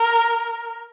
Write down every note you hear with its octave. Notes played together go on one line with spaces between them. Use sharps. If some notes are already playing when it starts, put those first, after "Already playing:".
Already playing: A#4